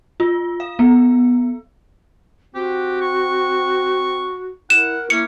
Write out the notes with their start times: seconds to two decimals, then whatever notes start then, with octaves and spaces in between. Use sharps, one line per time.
0.20 F4
0.60 F5
0.79 B3
2.55 C4 F#4 G4
3.01 C#6
4.70 E4 A#4 F#5 E7
5.10 A#3 C#4 E4 C#7